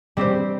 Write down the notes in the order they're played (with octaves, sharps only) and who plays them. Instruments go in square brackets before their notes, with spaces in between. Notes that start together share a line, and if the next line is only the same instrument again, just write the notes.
[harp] G3 C4 G4 C5